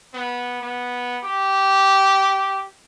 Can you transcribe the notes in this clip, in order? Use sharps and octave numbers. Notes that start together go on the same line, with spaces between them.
B3
B3
G4